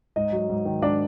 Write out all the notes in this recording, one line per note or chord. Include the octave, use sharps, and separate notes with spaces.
G#2 D#4 D#5
F#3
G#2
D#3
G#2 D4 D5